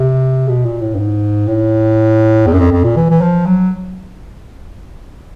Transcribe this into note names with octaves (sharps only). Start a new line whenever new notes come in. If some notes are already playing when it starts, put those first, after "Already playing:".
Already playing: C3
B2
A#2
A2
G2
G#2
A2
E2
F#2
F2
F2
A#2
E3
E3
F3
F#3